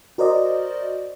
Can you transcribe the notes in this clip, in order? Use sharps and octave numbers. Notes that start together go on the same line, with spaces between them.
F#4 A#4 C5 D5 D#5